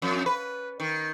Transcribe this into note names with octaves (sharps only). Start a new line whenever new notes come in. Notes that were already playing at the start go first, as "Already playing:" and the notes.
F2
B4
D#3